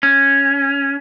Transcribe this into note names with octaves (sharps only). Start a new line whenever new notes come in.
C#4